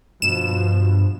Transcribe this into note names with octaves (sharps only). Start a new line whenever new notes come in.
G2 B2 F3 E7